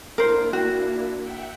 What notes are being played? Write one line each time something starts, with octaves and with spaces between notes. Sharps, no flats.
A#3 D4 E4 A#4 C5
F#4
E5 F#5 G5